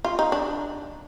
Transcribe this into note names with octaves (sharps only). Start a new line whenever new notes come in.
F4
D#4
D4